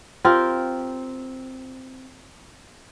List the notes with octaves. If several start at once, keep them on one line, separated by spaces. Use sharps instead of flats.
C4 F4 G4 A#4